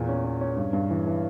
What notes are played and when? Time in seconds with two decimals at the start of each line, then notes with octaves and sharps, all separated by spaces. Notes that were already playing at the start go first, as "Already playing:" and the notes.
Already playing: E2 A#2
0.09 C#4
0.24 C#4
0.41 C#4
0.56 G2
0.73 G2
0.90 E3
1.07 E3